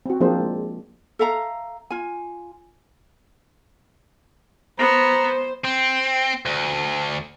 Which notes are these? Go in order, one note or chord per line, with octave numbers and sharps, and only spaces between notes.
C4 F#4
F3 A#3 C4 D4 G#4 C5
G#3
A4 E5 F5 A#5
F4 G#5
B3 C5 A#5
C4
D2